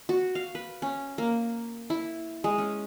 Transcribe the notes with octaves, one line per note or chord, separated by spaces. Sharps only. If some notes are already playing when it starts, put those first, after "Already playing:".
F#4
F5
B4
C#4
A#3
E4
G#3
C#4